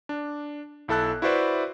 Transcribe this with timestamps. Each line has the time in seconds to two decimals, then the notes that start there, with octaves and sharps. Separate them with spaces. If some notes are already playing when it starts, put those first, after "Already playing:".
0.09 D4
0.88 B1 E4 A4 A5 F#6
1.22 E4 F#4 B4 C5 D5 E5